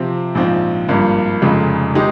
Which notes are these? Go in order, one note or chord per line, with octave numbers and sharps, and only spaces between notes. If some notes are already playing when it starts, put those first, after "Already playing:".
Already playing: C3 F3 C4
A#1 G#2 F3 C4 F4
G#1 G2 F3 A#3
F1 F2 C#3 G#3
D#3 G#3 D#4 G4